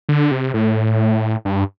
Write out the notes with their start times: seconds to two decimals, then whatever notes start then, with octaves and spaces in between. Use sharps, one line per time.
0.09 D3
0.31 C3
0.54 A2
1.45 G2